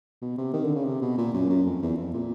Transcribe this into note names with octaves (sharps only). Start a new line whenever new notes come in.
B2
C3
D#3
D3
C#3
C3
B2
A#2
F#2
F#2
F2
E2
F2
A#2